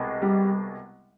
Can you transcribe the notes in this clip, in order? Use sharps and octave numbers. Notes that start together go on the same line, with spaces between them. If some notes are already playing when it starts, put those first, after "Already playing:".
Already playing: C2 B2 G#3
G3